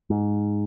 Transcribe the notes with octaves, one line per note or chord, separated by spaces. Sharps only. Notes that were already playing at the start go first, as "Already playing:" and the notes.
G#2